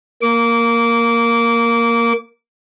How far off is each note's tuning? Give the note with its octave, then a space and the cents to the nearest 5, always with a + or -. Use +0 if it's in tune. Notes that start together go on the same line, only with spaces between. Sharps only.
A#3 +0 D6 -25